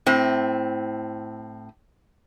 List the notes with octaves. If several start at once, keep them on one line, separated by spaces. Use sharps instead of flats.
A2 C4